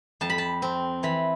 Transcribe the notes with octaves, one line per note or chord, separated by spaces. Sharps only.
F2 A5
B5
A5
C4
E3 B5